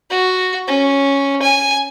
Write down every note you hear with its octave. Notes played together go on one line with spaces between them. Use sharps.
F#4
C#4
G#5